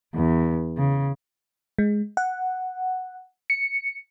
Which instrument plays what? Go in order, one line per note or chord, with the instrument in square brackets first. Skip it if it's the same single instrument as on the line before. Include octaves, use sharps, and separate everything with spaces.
[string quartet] E2
C#3
[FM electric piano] G#3
F#5
C#7